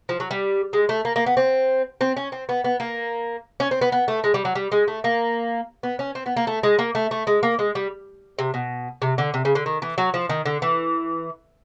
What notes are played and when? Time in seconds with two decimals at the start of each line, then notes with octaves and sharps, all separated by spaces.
0.09 F3
0.20 F#3
0.31 G3
0.73 G#3
0.89 A3
1.05 A#3
1.16 A#3
1.26 B3
1.37 C4
2.01 C4
2.17 C#4
2.32 C4
2.49 B3
2.64 B3
2.80 A#3
3.60 C#4
3.71 C4
3.81 B3
3.92 B3
4.08 A3
4.24 G#3
4.34 G3
4.45 F#3
4.55 G3
4.72 G#3
4.88 A3
5.04 A#3
5.83 B3
5.99 C#4
6.15 C4
6.26 B3
6.37 A#3
6.47 A3
6.63 G#3
6.79 A#3
6.95 A3
7.11 A3
7.27 G#3
7.43 A#3
7.59 G#3
7.75 G3
8.39 C3
8.54 B2
9.02 C3
9.18 D3
9.34 C3
9.45 C#3
9.55 D3
9.66 D#3
9.82 E3
9.98 F#3
10.14 F3
10.29 D#3
10.46 D3
10.62 E3